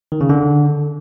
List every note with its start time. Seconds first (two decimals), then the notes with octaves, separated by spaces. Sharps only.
0.12 D#3
0.21 C#3
0.29 D3